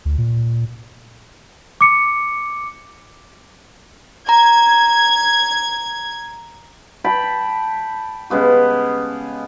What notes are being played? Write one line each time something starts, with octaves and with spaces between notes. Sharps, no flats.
D2
A#2
D6 C#7
A#5 G#6
G5 A5 B5
C#3 G#3 B3 G4